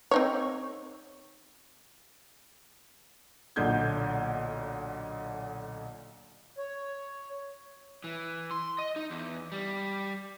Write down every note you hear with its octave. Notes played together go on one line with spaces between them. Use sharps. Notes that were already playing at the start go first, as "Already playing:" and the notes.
C4 D#4 C#5
B1 A#2 D3 G6 G#6
C#5
E3
C6
D#5
D#4
E2
G3